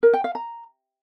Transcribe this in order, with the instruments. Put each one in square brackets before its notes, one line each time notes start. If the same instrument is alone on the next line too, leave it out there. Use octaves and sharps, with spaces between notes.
[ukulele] A#4
G5
F5
A#5